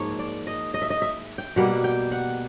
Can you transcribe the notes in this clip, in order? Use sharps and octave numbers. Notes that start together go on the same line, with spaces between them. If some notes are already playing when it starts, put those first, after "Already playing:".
Already playing: G#2 F3 A#3 A#4 C#5
D5
D#5
D#5
E5
D#5
E5
G5
B2 G3 A#3 F#5
G5
F#5